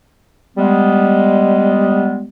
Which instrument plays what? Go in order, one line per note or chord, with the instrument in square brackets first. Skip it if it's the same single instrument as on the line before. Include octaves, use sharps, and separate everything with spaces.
[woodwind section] G3 G#3 B3